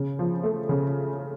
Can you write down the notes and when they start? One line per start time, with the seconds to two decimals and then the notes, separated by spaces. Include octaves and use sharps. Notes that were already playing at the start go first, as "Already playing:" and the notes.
Already playing: C#3
0.19 F3
0.43 A3
0.69 C#3